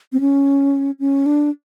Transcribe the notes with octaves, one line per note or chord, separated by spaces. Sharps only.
C4
C#4
C#4
D4